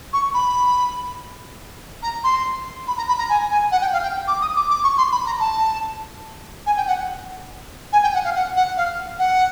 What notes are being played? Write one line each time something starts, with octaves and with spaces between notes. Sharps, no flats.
C#6
B5
A#5
C6
B5
A#5
B5
A#5
G#5
G#5
F#5
G5
F5
G5
D6
D#6
D6
D6
C#6
C6
B5
A#5
A5
G#5
G5
F#5
G#5
G5
F#5
F5
F#5
F#5
F5
F#5